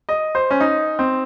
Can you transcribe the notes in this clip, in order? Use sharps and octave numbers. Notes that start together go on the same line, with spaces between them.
D#5
C5
C#4
D#4
C4